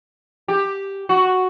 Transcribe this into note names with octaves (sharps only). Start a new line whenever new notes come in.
G4
F#4